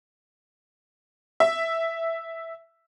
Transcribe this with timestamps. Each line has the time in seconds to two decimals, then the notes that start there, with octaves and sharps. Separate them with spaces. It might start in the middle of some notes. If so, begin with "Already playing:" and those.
1.40 E5